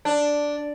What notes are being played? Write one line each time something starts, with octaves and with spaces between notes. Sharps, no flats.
D4